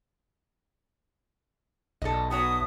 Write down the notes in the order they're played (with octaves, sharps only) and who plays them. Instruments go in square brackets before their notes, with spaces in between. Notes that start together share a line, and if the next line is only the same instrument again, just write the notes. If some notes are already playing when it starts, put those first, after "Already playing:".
[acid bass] B1 [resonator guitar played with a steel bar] A4 D#5
[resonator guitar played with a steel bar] B3 F#4 C#5 [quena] D#6